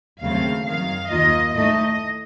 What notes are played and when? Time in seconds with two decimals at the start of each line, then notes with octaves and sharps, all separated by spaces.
0.21 D#2 C#3 F#3 A3 C4 F5
0.66 F#2 D#3 F#3 F5
1.11 D#2 D#3 A#3 F4 D#5
1.55 A2 A3 D#4 D#5